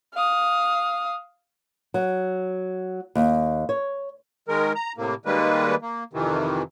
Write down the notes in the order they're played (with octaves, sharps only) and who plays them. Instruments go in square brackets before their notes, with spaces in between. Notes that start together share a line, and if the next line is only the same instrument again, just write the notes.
[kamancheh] F5 D#6
[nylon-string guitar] F#3
D#2
C#5
[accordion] D#3 G#3 A#4
A#5
A2 C3 A#3
D#3 G3 G#3 A#3 B4
A#3
F2 C3 D#3 E3